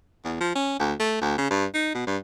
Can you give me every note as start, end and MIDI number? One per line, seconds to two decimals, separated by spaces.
0.25 0.41 40
0.41 0.54 53
0.55 0.78 61
0.79 0.93 38
1.00 1.20 57
1.21 1.35 38
1.38 1.50 49
1.51 1.66 43
1.74 1.90 63
1.94 2.02 47
2.07 2.18 43